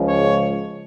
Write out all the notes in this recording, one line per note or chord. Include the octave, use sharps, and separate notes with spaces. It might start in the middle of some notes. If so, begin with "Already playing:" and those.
Already playing: C#2 C#3 F3 G#3
C#5